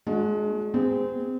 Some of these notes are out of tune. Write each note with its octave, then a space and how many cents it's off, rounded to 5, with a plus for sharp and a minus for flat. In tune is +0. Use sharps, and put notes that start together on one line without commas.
G#3 +25 D4 +0 F#4 -25
C4 -30 G#4 -30